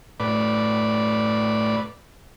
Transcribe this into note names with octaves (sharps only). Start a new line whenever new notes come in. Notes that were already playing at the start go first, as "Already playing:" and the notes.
A2 B4 D5